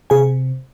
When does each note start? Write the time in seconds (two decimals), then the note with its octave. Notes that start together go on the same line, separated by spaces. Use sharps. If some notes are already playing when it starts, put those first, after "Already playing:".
0.10 C3 G#4 G#5